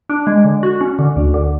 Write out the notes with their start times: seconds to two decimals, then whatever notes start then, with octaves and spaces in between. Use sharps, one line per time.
0.09 D4
0.27 G#3
0.45 D3
0.63 F#4
0.81 C#4
0.99 D3
1.17 D2
1.34 D3